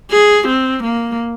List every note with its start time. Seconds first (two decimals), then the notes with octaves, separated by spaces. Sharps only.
0.11 G#4
0.48 C4
0.83 A#3